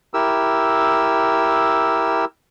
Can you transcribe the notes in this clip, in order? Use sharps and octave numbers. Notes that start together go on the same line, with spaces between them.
E4 G4 A#4 E6